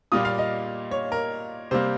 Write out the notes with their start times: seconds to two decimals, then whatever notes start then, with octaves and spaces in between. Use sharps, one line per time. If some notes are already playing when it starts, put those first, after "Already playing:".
0.12 A#2 G3 A#3 F4 D#6
0.25 F5
0.38 D#5
0.91 C#5
1.12 A#4
1.71 C3 G3 A#3 C5